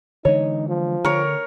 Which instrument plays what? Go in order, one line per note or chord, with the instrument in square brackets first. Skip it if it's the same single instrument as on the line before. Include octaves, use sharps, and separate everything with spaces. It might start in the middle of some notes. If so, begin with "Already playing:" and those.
[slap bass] D3 E3 G#3 [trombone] D#4 [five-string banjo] C#5
[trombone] F3
[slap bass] D3 [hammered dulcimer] A#4 C#5